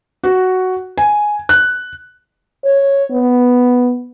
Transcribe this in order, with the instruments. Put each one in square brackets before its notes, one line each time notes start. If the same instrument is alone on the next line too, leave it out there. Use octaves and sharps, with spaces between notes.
[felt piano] F#4
G#5
F#6
[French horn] C#5
B3